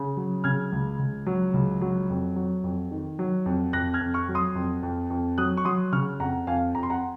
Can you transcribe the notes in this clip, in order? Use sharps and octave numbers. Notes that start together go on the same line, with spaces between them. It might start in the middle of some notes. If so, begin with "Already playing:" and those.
Already playing: C#3
F#3
C#3 F6 G#6
C#2
C#2
F#3
C#2
F#3
F2
F#3
F2
D#3
F#3
F2
F2 F#6 A#6
F6 G#6
F2
C#6 F6
F#3
C6 D#6
F2
F2
F2
F#3 D#6 F#6
C#6
F#3 C6 D#6
C#3 C#6 F6
F2 F#5 A#5
F2 F5 G#5
F2 A#5
C6
F#5 A#5